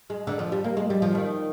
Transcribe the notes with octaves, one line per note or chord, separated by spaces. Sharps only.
G#3
D3
F3
G3
A#3
G#3
G3
F3
D#3